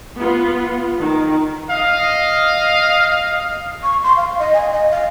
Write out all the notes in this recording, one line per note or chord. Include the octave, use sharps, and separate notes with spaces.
B3 F4
D#3
D#5 F5
C#6
C6
F5
D#5
G#5
D#5
F5